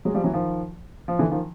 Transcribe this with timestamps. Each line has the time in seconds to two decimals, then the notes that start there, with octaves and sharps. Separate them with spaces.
0.05 F#3 G#3
0.14 F3 G3
0.24 E3 F#3
0.33 D#3 F3
1.08 F3
1.19 D3 E3
1.31 D#3 F3